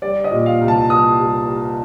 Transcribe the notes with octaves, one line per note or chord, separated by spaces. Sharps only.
G3 D5
D#5
A#2
F5
C2
A5
G3 D#6
G3